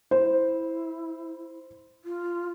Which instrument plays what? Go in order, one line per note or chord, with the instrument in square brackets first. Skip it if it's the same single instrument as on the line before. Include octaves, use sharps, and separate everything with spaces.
[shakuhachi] E4 [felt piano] C5
[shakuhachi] F4